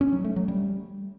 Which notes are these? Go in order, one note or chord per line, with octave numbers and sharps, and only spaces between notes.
C#4
F#3
A3
F#3
G3